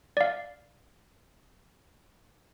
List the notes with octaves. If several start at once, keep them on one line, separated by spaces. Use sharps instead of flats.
D5 F5